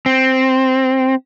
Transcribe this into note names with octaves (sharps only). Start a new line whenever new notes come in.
C4